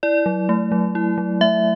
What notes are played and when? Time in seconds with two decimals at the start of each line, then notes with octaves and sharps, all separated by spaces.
0.03 E4 D5
0.26 F#3
0.49 A3
0.72 F#3
0.95 E4
1.18 F#3
1.41 A3 E5